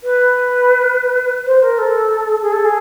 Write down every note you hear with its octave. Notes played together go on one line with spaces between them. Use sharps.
B4
C5
A#4
A4
G#4
A4
G#4